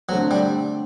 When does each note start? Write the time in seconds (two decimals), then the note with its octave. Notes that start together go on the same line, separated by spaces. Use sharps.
0.09 F#3 C4
0.11 D3 A3
0.31 G3